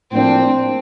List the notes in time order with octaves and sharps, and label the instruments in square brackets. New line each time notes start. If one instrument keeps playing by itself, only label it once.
[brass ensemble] A2 F3 A#3 D4 [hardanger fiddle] C4